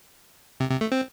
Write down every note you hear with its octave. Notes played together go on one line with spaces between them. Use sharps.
C3
C3
A3
C4